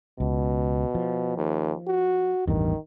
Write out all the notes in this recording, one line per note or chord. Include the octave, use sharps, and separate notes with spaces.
C#2 B2
F3
D#2
F#4
A1 E2 G2 D#3